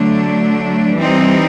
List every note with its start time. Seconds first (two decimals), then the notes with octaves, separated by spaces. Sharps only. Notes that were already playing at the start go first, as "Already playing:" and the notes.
Already playing: D3 F#3 A3 D4
0.94 E3 G3 C4 D#4